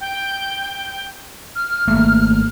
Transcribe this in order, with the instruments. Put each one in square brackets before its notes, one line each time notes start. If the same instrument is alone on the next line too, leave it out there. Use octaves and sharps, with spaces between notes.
[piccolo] G5
F6
[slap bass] G#1 A3 A#3